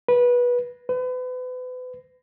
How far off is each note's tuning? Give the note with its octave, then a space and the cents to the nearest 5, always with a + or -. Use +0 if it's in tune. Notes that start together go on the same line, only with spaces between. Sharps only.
B4 -20
B4 +35